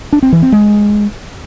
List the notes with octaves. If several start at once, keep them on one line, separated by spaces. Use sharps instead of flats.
D4
C4
E3
C4
G#3